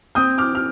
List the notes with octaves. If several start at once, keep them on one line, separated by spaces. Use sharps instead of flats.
C4 D#6 G6
D6 F6
F6